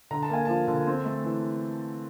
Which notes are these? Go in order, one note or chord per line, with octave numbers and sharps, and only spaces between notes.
D3 A#5
A5
A#3 G#5
F3 A5
D3
C4
A3
E3